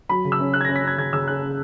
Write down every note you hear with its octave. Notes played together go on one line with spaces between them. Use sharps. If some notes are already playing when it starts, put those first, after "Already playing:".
F#3 B5
C#3
E6
C#4
C#4 F#6
G#6
C#4 A#6
B6
C#4 G#6
C#3 G#6
C#3 E6
C#4 F#6
C#4